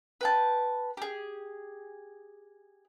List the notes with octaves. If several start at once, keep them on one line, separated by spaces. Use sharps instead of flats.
B4 G5 A5
G4 G#4